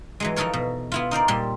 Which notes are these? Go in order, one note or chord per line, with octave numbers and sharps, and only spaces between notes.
E3 F#3 G#3
E3 F3 D#4 A4 A#4 C#5
B2
B3 E4 F4
D#4 A#4 C5 D5
A#2 G3 C6